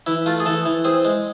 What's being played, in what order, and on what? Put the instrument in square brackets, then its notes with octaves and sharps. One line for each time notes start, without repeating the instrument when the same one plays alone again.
[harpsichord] E3 E4
A3 F4
G#4
E3 A4
E3
C4 G#4
G#3